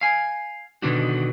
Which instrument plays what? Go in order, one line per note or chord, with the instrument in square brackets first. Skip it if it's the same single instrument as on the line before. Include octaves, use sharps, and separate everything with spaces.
[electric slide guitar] F5 G#5
B2 D3 D#3 B3 D4 F#4